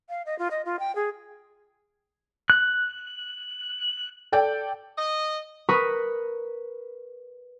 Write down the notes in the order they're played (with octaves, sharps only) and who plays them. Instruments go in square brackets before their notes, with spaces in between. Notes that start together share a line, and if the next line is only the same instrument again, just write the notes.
[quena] F5
D#5
F4
D#5
F4
G5
G#4
[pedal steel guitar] F#6
[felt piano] A4 D5 G5
[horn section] D#5
[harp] A#4 B4 B5 C#6 D#6